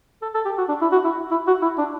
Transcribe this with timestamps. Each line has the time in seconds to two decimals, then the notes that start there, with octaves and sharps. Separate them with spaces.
0.22 A4
0.35 A4
0.45 G4
0.58 F#4
0.69 D4
0.81 E4
0.92 F#4
1.04 E4
1.31 E4
1.47 F#4
1.62 E4
1.78 D4